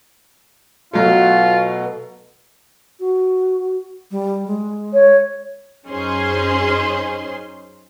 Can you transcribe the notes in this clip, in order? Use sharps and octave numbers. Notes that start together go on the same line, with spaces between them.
B2 F#3 A3 F4
F#4
G3
G#3
C#5
F#2 C#4 D#4 G#4 C5 C6